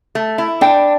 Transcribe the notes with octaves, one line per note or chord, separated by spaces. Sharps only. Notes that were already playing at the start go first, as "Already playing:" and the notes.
A3
E4
D4 G5